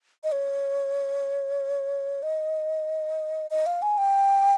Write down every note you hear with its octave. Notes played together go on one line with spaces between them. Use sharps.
D#5
C#5
D#5
D#5
F5
G#5
G5